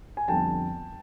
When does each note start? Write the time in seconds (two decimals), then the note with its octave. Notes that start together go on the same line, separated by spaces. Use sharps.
0.17 G#5
0.28 F2 D3 G3 B3 G5 A5